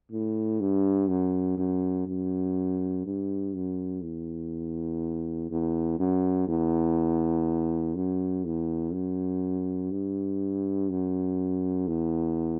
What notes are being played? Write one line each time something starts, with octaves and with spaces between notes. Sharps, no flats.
A2
G2
F#2
F#2
F#2
G2
F#2
E2
E2
F#2
E2
F#2
E2
F#2
G2
F#2
E2